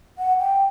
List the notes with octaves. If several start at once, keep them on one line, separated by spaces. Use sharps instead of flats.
F#5
G5